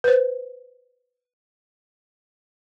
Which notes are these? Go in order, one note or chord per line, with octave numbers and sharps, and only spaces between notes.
B4 C5